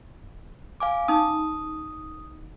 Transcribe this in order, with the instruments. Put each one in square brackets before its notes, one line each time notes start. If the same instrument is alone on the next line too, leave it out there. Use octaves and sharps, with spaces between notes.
[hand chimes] F5 G#5 D6
[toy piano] C#4 D#4 [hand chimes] D#6